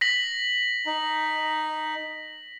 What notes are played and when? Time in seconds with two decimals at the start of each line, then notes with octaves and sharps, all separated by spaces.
0.01 A#6 B6 F#7
0.86 D#4